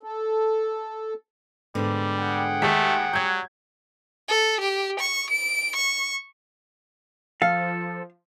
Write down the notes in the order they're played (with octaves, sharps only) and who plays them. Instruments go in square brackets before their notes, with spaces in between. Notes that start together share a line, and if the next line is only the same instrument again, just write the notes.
[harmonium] A4
[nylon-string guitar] G#2 D3 B3 [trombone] G3
[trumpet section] G#4 F#5 G5
[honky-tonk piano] D#2 G#3 B6 [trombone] A3
[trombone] F#3 [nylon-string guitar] G3 [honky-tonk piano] G6 G#6
[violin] A4
G4
C#6
D7
C#6
[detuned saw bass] F3 [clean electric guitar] A4 [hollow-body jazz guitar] F5